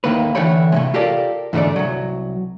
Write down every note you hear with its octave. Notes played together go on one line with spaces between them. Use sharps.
D#2 A2 D#3 A#3 B4
D3 E3 A3 C#5 G5 B5
A2 C3 G#3
F4 G4 A4 A#4 D5
E2 G#2 D3 A3 D5
C2 F#3